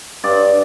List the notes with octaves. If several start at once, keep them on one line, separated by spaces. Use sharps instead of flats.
G2 D5